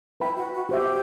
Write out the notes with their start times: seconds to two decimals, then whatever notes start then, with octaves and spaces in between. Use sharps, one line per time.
0.20 E4 B4 E5 G5 B5
0.36 F#4
0.53 F#4
0.69 F#4 G4 C5 E5